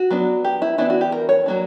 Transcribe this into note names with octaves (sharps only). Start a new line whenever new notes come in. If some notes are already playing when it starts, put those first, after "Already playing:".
Already playing: F#4
F#3 B3 D4
G4
E4
E3 B3 D4 E4
F#4
G4
A#4
C#5
F#3 A#3 D4